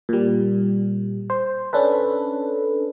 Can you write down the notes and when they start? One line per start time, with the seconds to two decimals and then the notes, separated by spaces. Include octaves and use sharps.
0.09 A#2 G3
1.30 C5
1.73 C#4 D4 A4 B4